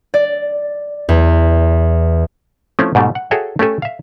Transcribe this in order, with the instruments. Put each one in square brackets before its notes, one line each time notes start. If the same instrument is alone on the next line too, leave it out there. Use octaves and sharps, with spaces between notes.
[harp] D5
E2
[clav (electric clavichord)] F3 A3 C4 C#4 E4
G#2 B2 G3 A3
F#5
F#4 G#4 A4 C#5 E5 G5
A3 C#4 G4 A4 G#5
E5 F5